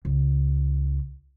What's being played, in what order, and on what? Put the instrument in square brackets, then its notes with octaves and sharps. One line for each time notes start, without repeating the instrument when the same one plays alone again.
[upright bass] C#2